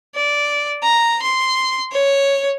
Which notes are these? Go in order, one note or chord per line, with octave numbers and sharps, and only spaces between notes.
D5
A#5
C6
C#5